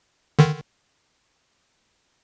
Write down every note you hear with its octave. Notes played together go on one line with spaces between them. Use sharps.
D3 D#3